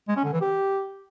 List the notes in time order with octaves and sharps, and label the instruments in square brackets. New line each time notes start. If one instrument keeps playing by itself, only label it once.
[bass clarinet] G#3
C#4
D3
E3
G4